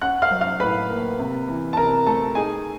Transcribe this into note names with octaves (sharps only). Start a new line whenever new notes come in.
C#4 F#5 F#6
F5 F6
F#3
F5 F6
A2 B4 B5
A#3
C3
E3
A5
C3 A#4 A#5
A3 A4 A5
D#4 G#4 G#5